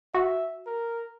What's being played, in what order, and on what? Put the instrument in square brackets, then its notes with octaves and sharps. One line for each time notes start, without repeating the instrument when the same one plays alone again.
[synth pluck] F#4 [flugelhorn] E5
[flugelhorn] A#4